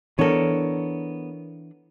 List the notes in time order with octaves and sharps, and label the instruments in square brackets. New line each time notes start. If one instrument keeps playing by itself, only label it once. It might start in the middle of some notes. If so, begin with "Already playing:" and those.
[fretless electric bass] E3 D4 [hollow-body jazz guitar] B3 A4 [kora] A#4 C#5